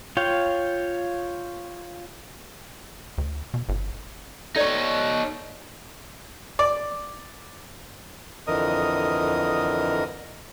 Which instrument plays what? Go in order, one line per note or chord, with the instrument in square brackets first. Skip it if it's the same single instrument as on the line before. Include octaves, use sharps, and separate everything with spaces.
[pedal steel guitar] F4 C#5 F5 G5
[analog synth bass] D2
B2
G1
[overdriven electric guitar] D#4 C#5 [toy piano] A4 D5
[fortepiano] D5
[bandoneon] F2 D3 E3 A#4 D#5 D#6